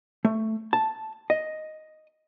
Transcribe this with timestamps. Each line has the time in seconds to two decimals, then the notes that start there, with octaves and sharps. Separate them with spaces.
0.25 A3
0.73 A5
1.30 D#5